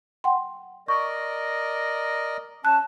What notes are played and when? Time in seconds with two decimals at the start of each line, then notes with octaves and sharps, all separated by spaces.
0.24 F#5 G5 C6
0.88 A#4 D5 D#5 C#6
2.65 C#4 A5 F#6